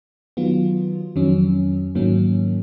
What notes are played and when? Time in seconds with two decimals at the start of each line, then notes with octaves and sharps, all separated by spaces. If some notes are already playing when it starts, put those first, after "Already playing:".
0.37 D#3 F#3 B3 F4
1.16 F2 D#3 F#3 C#4
1.95 G#2 D#3 F#3 A#3 C#4